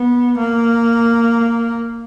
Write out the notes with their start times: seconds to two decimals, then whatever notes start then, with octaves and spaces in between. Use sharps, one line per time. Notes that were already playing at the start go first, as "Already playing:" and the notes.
Already playing: B3
0.38 A#3